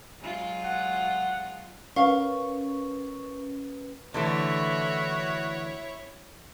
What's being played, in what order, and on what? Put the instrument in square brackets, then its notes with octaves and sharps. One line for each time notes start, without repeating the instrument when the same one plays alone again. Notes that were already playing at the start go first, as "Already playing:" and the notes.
[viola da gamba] F#3 G#3 F4
[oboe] F#5
[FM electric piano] C#4 B4 [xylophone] A#4 [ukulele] F5 [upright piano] C#6
[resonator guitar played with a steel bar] D3 E3 A3 [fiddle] E4 C#5 [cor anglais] F#4